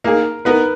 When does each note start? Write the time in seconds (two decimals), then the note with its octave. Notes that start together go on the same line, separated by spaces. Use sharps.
0.04 A#3 D#4 G#4 A#4
0.45 B3 D#4 A#4 B4